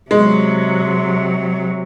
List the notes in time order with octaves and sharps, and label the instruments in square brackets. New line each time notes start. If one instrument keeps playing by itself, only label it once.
[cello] C3 F#3 [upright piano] G#3